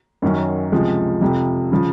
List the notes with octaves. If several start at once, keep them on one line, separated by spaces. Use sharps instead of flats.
F#2 D#3 F#3 C#4
C#2 C3 F3 G#3
F2 C3 F3
C#3 F3